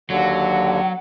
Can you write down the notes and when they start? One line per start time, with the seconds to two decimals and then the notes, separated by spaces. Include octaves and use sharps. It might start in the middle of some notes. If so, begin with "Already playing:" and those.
0.10 D#2 D3 F#3 F#5